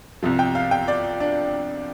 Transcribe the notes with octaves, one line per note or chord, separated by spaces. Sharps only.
C2 C3 F3
G5
F5
G5
D5
D4